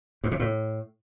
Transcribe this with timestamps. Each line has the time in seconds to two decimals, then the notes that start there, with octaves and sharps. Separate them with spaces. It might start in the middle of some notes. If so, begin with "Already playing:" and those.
0.24 G2
0.32 C3
0.40 A2